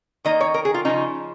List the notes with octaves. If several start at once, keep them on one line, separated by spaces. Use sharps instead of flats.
D#3 A#3 D#4 D#5
C#5
A#4
G#4
F4
C#3 F3 C#4 D#4